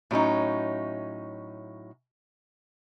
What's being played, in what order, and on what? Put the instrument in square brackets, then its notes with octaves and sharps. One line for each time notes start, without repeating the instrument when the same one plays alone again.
[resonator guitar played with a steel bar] A2 F#3 C#4 D#4